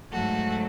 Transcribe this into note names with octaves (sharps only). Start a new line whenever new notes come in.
G#2 F#3 A3 F#4 A4